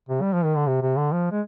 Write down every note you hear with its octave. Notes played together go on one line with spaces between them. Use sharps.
C3
G3
F3
D#3
D3
C3
C3
D3
F3
G#3